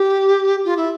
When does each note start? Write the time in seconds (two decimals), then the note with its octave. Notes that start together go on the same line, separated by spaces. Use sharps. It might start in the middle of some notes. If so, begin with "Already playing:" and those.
Already playing: G4
0.65 F4
0.77 E4